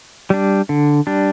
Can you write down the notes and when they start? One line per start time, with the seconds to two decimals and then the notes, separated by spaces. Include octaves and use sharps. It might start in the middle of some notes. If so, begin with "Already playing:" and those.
0.30 G3 D4
0.69 D3
1.07 G3 D4